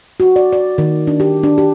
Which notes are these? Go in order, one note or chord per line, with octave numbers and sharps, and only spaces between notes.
F#4
D5
D5
D#3
D4
G4
D4
G4